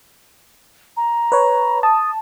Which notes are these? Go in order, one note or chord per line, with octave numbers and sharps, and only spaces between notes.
A#5
B4 C#5
A5 D#6